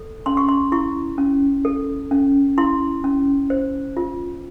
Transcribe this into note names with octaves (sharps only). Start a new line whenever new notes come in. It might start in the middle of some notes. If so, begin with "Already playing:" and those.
Already playing: A4
C#4 C6
C#6
C6
E4 C#6
C#4
A4
C#4
E4 C6
C#4
C5
F4